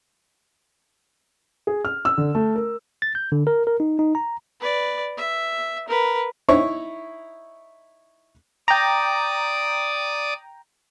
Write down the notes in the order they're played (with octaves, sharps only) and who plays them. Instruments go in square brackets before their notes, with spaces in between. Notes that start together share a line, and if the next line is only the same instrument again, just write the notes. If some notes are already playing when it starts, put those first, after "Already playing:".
[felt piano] G#4
F6
E6
D3
A3
A#4
[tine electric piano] A6
G6
D3
A#4
A#4
D#4
D#4
A#5
[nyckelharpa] B4 D5
E5
A#4 B4
[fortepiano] D#4 E4 C#5 C#6
[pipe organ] D5 D6 D#6 [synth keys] G5 A#5